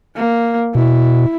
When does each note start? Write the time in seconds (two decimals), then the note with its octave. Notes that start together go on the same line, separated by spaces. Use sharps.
0.16 A#3
0.75 B2 E4